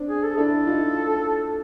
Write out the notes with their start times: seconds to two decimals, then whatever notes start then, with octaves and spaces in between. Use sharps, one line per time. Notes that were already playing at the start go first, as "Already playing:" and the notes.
Already playing: C4 D4
0.09 G#4
0.23 A4
0.38 D4 E4 A4
0.67 D#4 F4